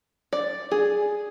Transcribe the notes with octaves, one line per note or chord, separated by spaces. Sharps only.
D5
G#4